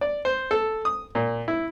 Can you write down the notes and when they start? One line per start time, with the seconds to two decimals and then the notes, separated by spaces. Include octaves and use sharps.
0.01 D5
0.25 C5
0.51 A4
0.85 D#6
1.15 A#2
1.48 E4